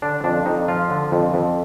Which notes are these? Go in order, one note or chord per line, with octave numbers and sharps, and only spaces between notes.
D3 D4
F2 D4
F2 D#4
F3 F4
D3
F2
F2